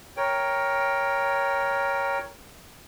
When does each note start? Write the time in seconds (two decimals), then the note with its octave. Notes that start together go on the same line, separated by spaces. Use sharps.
0.17 A#4 C#5 G5